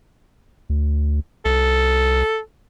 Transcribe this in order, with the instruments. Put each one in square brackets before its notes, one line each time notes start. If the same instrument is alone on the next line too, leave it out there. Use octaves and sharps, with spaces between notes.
[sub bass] D2
[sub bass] C2 [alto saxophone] A4